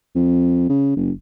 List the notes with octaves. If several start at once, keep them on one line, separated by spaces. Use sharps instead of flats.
F2
C#3
F#1